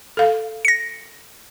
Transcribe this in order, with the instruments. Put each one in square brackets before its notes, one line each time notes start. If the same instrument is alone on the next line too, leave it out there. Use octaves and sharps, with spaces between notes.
[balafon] A4 F5
[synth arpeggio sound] A#6 C#7